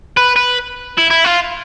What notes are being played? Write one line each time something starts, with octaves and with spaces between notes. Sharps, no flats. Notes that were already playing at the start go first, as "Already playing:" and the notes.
B4
B4
E4
E4
F4